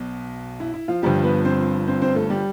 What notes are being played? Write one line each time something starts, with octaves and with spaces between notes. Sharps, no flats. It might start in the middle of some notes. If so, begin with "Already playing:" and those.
Already playing: B1 B2
E4
E4
F3 F4
G1 G2 F3 G3 G4
B3 B4
C4 C5
C4 C5
C4 C5
A3 A4
G3 G4